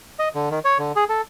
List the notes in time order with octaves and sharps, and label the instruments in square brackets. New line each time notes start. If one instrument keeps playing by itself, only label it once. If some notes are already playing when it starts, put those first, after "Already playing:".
[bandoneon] D#5
D3
D#3
C#5
D3
G#4
A4